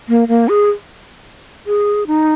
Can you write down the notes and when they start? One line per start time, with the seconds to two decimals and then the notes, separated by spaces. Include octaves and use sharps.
0.09 A#3
0.28 A#3
0.49 G#4
1.67 G#4
2.07 D#4